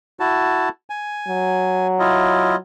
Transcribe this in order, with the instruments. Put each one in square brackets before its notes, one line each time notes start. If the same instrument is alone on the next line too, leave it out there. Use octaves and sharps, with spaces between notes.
[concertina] E4 F#4 A5
G#5
[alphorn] F#3
[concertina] E4 F4 D#5